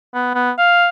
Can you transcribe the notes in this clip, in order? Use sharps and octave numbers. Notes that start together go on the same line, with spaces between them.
B3
B3
F5